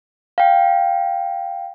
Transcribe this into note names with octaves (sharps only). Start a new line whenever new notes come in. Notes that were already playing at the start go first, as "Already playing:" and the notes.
F5 G5